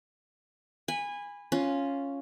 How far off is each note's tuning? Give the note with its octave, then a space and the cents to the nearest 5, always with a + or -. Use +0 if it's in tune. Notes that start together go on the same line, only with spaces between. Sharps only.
G#5 -20 B5 +0
C#4 +0 F4 +0